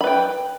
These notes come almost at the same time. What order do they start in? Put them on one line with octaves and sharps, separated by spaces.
B5 B4 G5